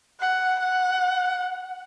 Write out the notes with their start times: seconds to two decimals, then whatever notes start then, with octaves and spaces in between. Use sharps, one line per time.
0.20 F#5
0.59 F#5